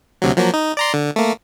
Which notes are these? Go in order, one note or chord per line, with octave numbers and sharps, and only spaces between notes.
D2 C3 F#3
F3 F#3 A#3
D#4
D5 A#5 C6
D3
A3 A#3